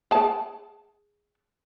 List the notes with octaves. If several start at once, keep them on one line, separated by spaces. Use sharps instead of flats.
G#4 A5